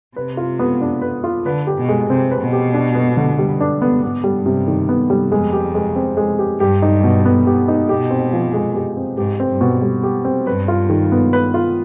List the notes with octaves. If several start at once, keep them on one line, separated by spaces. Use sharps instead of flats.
C3 B4
F4
B3
D4
B4
F4
D3 B4
G4
B2
G#3
C3 C4
B4
B2
G4
D4
B3
D3
G3
D4
B3
G#2 B3
G3
G2
C3
D#3
B3
G3
F2 G#3
G4
G#3
C4
G#3
G4
G2 G4
D#4
B2
B3
G4
D#4
B2 G4
C4
F3
G#3
G4
C4
G#2 G4
C4
G2
B2
G3
G4
C4
G2 B4
F4
D#3
B3
B4
F4